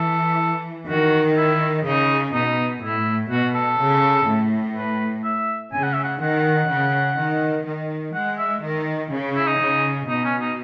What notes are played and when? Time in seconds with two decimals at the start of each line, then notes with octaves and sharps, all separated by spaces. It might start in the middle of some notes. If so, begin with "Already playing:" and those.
Already playing: E3 A4
0.88 D#3 F#4
1.37 E4
1.85 C#3 D#4
2.33 B2 D#4
2.82 A2 E4
3.30 B2 F#4
3.54 A4
3.79 C#3
4.27 A2
4.76 B4
5.24 E5
5.73 C#3 G#5
5.83 F#5
5.93 E5
6.04 F#5
6.21 D#3 F#5
6.69 C#3
7.17 D#3
7.66 D#3
8.14 G#3 F#5
8.38 E5
8.63 D#3
9.11 C#3
9.36 E4
9.47 D#4
9.60 C#3
10.08 B2 D#4
10.24 C#4
10.41 D#4